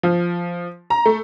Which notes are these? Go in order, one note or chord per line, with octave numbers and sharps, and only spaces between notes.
F3
A#5
A3